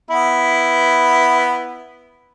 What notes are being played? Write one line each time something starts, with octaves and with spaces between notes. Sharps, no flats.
B3 E4